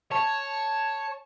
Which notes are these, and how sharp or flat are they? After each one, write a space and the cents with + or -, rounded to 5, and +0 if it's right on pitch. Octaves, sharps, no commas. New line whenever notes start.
C#5 +0 A5 +0